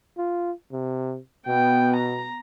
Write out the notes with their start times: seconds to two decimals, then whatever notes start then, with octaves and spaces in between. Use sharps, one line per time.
0.18 F4
0.72 C3
1.47 B2 B3 G5
1.96 A#5